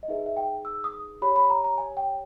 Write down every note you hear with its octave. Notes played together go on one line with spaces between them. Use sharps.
D#5
D#4 G#4 B4 E5
E5
G5
E6
D#6
G4 C#5 B5
B5
A#5
A#5
G#5
G5